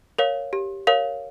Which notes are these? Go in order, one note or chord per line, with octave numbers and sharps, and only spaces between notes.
A#4 C#5 F5
G4
A#4 C#5 F5